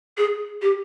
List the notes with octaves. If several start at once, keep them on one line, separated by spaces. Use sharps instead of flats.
G#4
G4